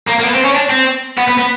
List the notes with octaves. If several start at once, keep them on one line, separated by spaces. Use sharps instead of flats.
A#3
A#3
B3
C4
C#4
D4
C4
B3
B3
B3